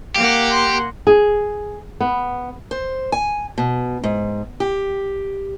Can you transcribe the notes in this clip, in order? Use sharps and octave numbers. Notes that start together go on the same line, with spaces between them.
A#3 G4 F5 F#5
C6
G#4
B3
C5
G#5
B2
G#2
G4